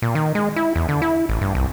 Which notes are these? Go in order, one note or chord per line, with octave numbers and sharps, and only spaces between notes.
A#2
D#3
G#3
E4
E2
D3
E4
A1
G2
C2